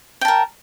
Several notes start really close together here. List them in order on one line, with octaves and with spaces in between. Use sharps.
G5 A5 A#4